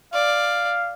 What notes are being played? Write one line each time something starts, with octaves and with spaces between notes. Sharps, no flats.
D5 F5